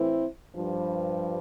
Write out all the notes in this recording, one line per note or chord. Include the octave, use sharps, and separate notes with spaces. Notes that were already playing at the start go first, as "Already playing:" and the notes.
Already playing: A2 E3 C4 E4
G2 F3